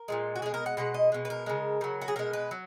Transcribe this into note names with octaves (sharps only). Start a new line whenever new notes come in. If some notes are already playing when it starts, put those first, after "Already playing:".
Already playing: A#4
A#2 F3 G#3
F#4
B2 G#3 G#4
A#4
F#5
B2 G#3 F#5
D#5
B2 G#3
B4
A#4
C#3 G#3
C#3 F#3
F#4
G#4
B2 G#3 A#4
B4
F#3